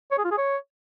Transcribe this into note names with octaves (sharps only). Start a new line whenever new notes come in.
C#5
G#4
F4
G#4
C#5